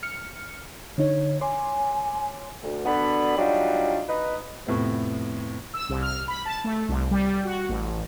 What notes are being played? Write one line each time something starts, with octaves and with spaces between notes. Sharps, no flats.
F6 C#7
D3 D#4 C#5
C#5 G#5 C6 D6
D2
D3 B3 D4 F#4 B5
F#3 G3 D4 D#4 F4 F#4
D#4 B4
F2 A2 C3 B3
E6
C2
F6
B5
A5
A3
C2
G3
F#4
A1